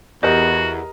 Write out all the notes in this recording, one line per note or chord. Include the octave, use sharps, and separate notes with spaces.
E2 F#4 G4 A#4 D#5